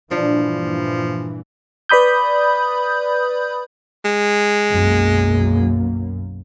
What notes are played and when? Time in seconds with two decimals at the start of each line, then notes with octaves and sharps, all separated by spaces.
0.11 G2 A#2 E3 F3 D4
1.89 B4 D5 B5 D#6 G6
4.05 G#3
4.69 B1 F#2 A#3